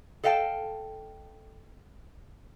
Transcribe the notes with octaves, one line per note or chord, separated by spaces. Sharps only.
A4 D#5 F5 G5 A5